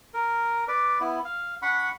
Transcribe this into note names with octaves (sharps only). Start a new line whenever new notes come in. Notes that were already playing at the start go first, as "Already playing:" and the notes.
A#4
B4 D5 D6
B3 E4
F5
D4 F#5 B5 C#6